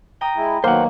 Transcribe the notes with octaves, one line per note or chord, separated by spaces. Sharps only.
G5 A#5 D#6
G#3 E4
B2 D#3 F#3 A#3 C5 F#5